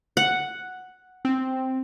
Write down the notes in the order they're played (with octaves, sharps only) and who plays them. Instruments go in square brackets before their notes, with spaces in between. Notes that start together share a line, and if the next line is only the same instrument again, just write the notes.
[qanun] F#5
[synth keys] C4